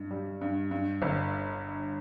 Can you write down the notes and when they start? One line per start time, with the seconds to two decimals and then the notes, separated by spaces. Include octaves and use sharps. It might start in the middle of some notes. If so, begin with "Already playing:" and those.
Already playing: G2
0.11 G3
0.41 G2
0.71 G2
1.02 G1